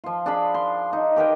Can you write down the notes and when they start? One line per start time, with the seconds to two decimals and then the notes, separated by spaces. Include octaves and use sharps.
0.04 F3 F4
0.26 D4 G#4 F5 B5
0.54 C6
0.93 D#4
1.16 G4 A#4 B4 G5